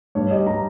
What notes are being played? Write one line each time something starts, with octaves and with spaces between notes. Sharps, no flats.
G2 C#5
G3 D#5
G3 A#5